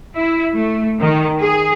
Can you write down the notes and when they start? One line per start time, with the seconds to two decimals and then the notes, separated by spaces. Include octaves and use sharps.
0.16 E4
0.55 A3
1.00 D#3
1.40 G#4